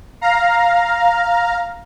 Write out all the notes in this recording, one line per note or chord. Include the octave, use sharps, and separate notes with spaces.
F5 A#5